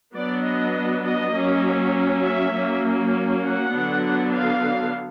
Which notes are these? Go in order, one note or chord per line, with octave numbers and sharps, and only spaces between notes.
F#3 B3 D4 D5
D#5
D#5
F#3 A#3 C#4
E5
F#3 A#3 C#4
F#5
D3 F#3 B3 D4
F5